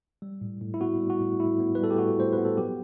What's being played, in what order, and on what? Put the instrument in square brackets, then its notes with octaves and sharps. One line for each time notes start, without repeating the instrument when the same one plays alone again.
[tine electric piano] G3
A2
A2
E4
B3 F#4
G3
F#4
A2
A2 E4
B3
B4
G3 A4
G4
A2 F#4
A2 C5
B4
B3
A4
F#3 G4